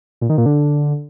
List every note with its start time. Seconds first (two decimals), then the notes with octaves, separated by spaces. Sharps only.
0.21 A#2
0.30 D#3
0.38 A#2
0.46 D3